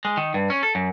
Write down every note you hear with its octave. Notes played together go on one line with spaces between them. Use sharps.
G#3
D#3
G2
C#4
A4
F#2